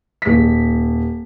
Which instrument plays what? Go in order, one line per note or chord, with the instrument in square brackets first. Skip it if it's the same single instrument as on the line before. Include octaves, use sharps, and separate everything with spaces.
[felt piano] D#1 B6